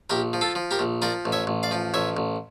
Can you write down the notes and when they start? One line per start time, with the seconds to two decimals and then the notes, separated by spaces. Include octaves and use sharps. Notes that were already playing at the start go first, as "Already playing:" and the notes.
0.10 A#1 G4 A#4
0.33 F3
0.41 F4 A4
0.55 F3
0.71 G4 A#4
0.79 A#1
1.02 F3 A#4 D5
1.25 A1
1.32 C#5 E5
1.47 A1
1.63 D5 F5
1.71 F3
1.94 A1 C#5 E5
2.17 A1